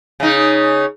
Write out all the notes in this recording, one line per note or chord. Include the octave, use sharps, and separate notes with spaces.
C#3 D#4